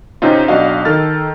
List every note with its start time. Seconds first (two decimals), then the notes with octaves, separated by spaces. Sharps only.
0.22 C3 C4 C#4 D#4 F4
0.48 B1 D4 F#4 D#5 F5
0.85 D#3 A4 F6 A6